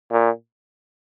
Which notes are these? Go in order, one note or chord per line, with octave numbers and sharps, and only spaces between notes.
A#2